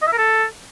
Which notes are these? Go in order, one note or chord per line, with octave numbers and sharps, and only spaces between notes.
D#5
E5
A#4
A4